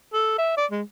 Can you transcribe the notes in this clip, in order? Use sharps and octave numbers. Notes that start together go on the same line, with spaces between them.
A4
E5
D5
G#3